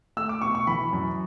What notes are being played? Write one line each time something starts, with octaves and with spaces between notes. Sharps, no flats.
A3 E6
D6
B2 C#6
C#6
E3 B5
F#2